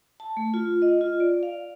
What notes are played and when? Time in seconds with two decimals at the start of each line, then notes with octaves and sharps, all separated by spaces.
0.20 A5
0.37 A3
0.54 F4
0.82 D#5
1.01 F4
1.20 D5
1.43 F5